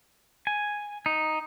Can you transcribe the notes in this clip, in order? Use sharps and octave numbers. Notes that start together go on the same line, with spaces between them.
G#5
D#4